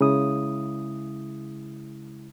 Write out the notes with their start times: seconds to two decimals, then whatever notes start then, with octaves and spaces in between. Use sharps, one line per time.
0.01 C#3 G#3 E4 D#6